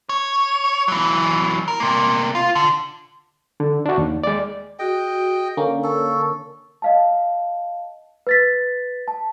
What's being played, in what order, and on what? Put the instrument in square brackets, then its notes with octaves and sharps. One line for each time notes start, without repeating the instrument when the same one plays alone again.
[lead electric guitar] C#5
E3 F#3
A#4
C3 A#3
F4
D3
[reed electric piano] D3
D4 F#4
D#2
G#3 D5
[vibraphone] F#4 G#4 [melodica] D#5 G5
[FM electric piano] D3 A#3 C#4
[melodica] A4 [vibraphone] C#6
[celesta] D#5 F5 A5
B4 A6 B6
A5